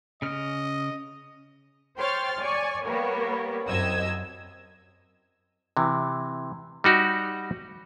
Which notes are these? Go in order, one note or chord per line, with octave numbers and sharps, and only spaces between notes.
C#3 D#5 F6
C5 C#5 G5 C6 F6 A6
C#5 D5 G#5 C#6
G3 A#3 B3 A#4 C#5
C2 F#2 D#5 E6 G#6
C3 E3
G3 D#4 F#4 G4